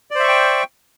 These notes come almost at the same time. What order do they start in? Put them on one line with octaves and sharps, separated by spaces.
D5 C5 E5 C#6 G5